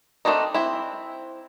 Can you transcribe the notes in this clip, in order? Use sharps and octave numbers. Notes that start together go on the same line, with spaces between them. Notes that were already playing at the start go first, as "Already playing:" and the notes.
A3 A#3 C4 D4 D#4
C4 E4